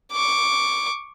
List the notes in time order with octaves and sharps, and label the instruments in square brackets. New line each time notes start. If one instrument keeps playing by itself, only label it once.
[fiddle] C#6 D6